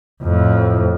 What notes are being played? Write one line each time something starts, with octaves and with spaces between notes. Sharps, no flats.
F2 A2